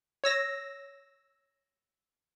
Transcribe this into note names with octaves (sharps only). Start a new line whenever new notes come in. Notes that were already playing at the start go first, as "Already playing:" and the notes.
C#5 E6 A#6